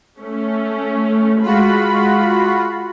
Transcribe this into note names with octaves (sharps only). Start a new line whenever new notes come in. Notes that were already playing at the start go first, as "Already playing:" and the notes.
A3 C#4
G#3 F4 F#4 B5